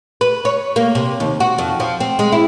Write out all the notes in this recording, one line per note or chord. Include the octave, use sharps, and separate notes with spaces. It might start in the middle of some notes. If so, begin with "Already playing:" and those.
B4
C#5
A#3
C3
D#2
F#4
F2
F3
C4
G#3
E4